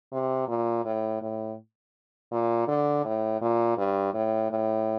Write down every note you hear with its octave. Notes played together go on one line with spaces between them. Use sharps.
C3
A#2
A2
A2
A#2
D3
A2
A#2
G2
A2
A2